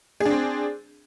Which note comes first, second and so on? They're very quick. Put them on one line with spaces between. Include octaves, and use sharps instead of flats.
G#4 D4 C4